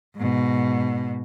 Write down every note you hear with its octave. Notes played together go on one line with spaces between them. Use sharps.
G#2 B2